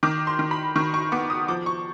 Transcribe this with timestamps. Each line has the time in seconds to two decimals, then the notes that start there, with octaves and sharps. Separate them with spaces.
0.03 D#3 D6
0.27 C6
0.39 D#3
0.51 B5
0.76 D#3 C#6
0.94 C#6
1.12 B3 D6
1.30 D#6
1.48 F3 D6
1.66 C#6